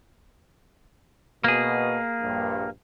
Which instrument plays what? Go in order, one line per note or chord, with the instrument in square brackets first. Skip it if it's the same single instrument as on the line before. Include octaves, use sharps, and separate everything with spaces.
[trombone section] B2 [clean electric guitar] A#3 G#4
[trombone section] A#1 G2